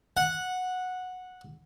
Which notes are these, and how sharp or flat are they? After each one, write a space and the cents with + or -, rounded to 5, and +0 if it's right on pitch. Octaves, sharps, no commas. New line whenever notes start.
F#5 -10